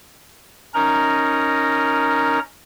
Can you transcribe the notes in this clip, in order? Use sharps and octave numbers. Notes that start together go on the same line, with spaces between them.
C#4 D#4 A#4 A#5